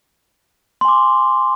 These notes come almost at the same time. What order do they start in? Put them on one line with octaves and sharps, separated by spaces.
C6 G#5 D6